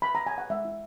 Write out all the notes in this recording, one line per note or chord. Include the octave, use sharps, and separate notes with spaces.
B5
A#5
G#5
F#5
G#3 E5
E4